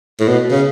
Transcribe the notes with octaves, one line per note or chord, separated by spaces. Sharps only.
A2
B2
C#3